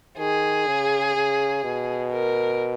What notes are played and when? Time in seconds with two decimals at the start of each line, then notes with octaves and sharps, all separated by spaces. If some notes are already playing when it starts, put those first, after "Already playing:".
0.18 D#3 G#4
0.67 C#3
1.16 C#3
1.64 B2
2.13 A#4